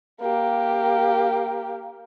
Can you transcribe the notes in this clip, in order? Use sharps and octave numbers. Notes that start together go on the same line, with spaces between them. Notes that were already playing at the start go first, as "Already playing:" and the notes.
A#3 G4